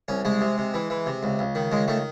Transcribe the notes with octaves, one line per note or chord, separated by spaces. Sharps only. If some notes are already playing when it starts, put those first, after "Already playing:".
C2 C#4
C2 G#3
C3
C3
E3
E3
C3
C#2
C#2
D#3
C#2 G#3
D#3 A3